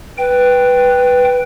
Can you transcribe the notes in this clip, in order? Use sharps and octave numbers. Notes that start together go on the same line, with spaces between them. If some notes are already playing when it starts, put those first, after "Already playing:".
B4 G5